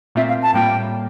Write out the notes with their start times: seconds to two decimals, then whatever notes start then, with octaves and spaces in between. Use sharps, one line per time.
0.15 A#2 A3 C4 F4 E5
0.29 F5
0.42 A5
0.54 A2 G3 A#3 F4 G5